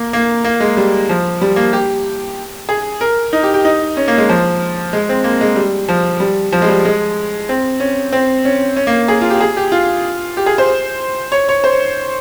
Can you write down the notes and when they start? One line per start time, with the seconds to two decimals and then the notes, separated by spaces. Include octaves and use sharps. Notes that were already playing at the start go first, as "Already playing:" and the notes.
Already playing: A#3
0.13 A#3
0.44 A#3
0.60 G#3
0.77 G3
1.09 F3
1.41 G3
1.56 A#3
1.73 G4
2.69 G#4
3.01 A#4
3.33 D#4
3.43 G4
3.54 G4
3.65 D#4
3.97 C#4
4.08 A#3
4.18 G#3
4.29 F3
4.93 G#3
5.09 C4
5.24 A#3
5.41 G#3
5.56 G3
5.89 F3
6.20 G3
6.52 F3
6.62 G#3
6.68 G3
6.85 G#3
7.49 C4
7.80 C#4
8.12 C4
8.45 C#4
8.76 C#4
8.87 A#3
9.08 G#4
9.21 F4
9.30 G4
9.41 G#4
9.57 G4
9.72 F4
10.37 G4
10.46 G#4
10.58 C5
11.32 C#5
11.49 C#5
11.64 C5